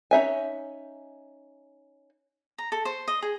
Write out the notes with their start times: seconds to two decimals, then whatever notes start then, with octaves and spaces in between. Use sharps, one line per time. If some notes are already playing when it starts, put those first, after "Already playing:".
0.11 C#4 D#4 E5 G#5
2.58 A#5
2.72 A4
2.85 C5
3.08 D#5
3.22 G#4